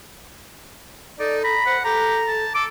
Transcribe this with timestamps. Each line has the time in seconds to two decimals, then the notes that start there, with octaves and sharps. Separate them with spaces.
1.19 D#4 A4 D5
1.44 A#5 B5
1.66 C5 F#5
1.85 G4 A4 A#5
2.27 A5
2.55 A4 D6